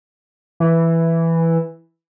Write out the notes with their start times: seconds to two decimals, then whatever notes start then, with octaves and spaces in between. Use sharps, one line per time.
0.60 E3